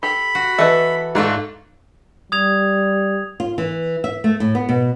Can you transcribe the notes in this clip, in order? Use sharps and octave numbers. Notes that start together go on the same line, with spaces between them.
G4 A4 B5
F#4
E3 A4 B4 D#5 E5
G#2 A3 F4 D5
G3 D#6 G#6 F7
F4
E3
E5
A3
A2
B3
B2